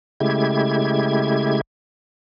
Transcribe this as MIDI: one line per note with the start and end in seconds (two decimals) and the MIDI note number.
0.20 1.61 49
0.20 1.61 56
0.20 1.61 57
0.20 1.61 64
0.20 1.61 67
0.20 1.61 92